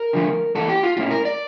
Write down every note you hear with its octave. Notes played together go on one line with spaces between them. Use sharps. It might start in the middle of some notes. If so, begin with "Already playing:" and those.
Already playing: A#4
D3 F3 A3
E2 E3 A#3 A4
G4
F4
A#2 A3 C#4 E4 F4
A#4
D5